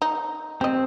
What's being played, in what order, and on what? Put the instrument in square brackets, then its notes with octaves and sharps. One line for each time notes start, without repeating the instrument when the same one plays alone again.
[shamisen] D#4
[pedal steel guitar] C4 [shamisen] G4 D#5